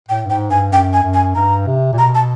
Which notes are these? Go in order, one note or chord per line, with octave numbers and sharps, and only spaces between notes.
A2 G5
G2
G#2 G5
G2 G#5
F#2 G5
G#5
F#2
G#5
G2 A#5
C3
A#2
B2 A#5
A5